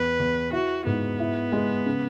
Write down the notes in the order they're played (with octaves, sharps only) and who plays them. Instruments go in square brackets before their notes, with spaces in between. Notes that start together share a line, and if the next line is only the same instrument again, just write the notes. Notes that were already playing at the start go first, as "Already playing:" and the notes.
Already playing: [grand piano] E2 [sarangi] B4
[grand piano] E2
[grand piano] E4 [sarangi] F#4
[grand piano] G#2 [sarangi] B3
[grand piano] E4
G#3
C#3